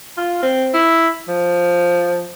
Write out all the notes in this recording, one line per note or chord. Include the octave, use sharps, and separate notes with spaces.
F4
C4
E4
F3